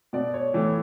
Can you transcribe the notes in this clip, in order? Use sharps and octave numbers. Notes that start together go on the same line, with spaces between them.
B2 D5
C#5
A2 E3